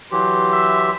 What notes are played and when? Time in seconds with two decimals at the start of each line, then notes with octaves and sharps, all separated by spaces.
0.12 E3 F#3 G4 C6
0.52 E5